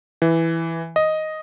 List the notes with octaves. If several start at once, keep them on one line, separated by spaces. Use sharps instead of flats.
E3
D#5